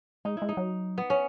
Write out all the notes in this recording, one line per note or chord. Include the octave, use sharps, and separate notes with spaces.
G#3 D#4
G#3 E4
D#4
F#3
B3
C#4